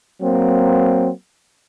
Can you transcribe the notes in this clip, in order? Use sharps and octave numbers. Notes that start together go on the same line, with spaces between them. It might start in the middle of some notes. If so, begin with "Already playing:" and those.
F#3 A#3 C4